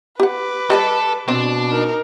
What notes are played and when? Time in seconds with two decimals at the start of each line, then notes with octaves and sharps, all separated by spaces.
0.20 G4 B4 F#5 D6
0.70 G3 A4 D5 D#5 A5
1.28 B2 C4 D4 C5
1.70 D#4 A#4